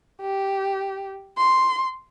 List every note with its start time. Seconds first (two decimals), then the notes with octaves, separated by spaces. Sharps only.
0.21 G4
1.37 C6